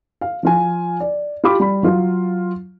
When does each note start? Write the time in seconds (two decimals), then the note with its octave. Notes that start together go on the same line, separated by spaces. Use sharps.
0.21 F5
0.43 F3 F4 G#5
1.00 D5
1.44 F4 G4 B5 D6
1.60 G3 B5
1.83 F#3 F4